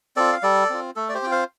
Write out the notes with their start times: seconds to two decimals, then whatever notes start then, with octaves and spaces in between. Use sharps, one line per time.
0.16 C4 F4 A4 D5
0.32 F5
0.43 G3 A4 D5
0.70 C4 F4
0.96 A3 A4
1.09 D5
1.14 G4 C5
1.22 C4 F4 G5
1.31 C5 F5